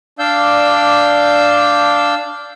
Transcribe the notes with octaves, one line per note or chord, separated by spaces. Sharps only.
D4 D5 F5 E6 G6